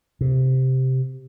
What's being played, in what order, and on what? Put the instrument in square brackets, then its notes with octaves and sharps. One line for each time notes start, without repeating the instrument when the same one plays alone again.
[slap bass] C3